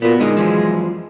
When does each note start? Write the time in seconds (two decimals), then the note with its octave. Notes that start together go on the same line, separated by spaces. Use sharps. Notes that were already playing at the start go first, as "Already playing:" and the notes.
0.02 A#2 B3 F#4
0.20 D3 G#3 D#4
0.37 F#2 E3 F3